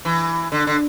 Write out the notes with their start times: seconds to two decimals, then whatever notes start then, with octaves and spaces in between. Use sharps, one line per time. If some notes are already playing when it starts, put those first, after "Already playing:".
0.05 E3
0.52 D3
0.67 D3